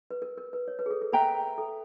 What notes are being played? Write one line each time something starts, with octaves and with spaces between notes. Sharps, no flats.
B4
A#4
A#4
B4
C#5
B4
G#4
A4
A4
A#4 B4 E5 G5 A#5
A4